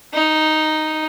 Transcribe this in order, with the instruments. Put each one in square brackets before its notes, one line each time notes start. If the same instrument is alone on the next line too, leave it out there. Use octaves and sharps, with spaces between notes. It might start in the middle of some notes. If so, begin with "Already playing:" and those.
[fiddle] D#4